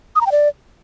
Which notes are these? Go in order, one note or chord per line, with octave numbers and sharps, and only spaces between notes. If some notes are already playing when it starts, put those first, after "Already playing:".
D#6
A#5
G5
D5